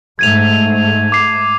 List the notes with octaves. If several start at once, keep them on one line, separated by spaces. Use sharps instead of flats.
G#2 A3 G#6 D#7 F7
D6 C7